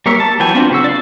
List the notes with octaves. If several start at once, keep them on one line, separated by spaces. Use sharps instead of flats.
G3 A#3 A#4 C#5 E5
A5
E3 F#3 G5 G#5
B3 C4 D4 F4 F#4
C#3 F#4 E6
D5 F5